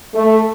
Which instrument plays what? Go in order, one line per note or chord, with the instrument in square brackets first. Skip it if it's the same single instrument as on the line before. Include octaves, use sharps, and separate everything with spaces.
[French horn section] A3